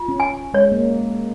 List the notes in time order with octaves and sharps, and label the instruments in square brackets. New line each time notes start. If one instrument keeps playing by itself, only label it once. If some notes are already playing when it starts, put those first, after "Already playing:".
Already playing: [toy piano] F4
[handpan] C#4
[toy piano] G#5
[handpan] G#3 [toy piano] C#5
[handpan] A#3